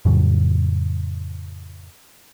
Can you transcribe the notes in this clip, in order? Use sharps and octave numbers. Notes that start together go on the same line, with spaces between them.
F2 A2 C#3 F#3